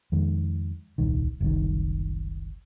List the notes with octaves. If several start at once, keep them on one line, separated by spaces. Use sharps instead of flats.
F2 D#3 G#3
D#1 C2 D#3
F#1 C2 D#3